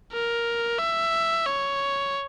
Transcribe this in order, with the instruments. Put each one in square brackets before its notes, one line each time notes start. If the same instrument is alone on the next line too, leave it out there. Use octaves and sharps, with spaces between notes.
[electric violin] A#4
E5
C#5